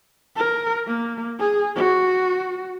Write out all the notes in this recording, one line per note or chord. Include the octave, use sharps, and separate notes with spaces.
A#4
A#3
G#4
F#4